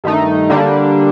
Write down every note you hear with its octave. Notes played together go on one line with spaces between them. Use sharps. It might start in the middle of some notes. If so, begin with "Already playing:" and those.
G2 D#3 A3 D#4
D3 G3 A#3 D4